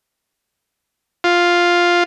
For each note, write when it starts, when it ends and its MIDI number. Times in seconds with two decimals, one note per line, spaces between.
1.24 2.04 65